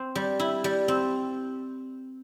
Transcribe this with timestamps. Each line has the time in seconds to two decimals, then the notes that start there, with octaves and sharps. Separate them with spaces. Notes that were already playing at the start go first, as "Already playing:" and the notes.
Already playing: C4
0.15 G3
0.40 E4
0.64 G3
0.88 C4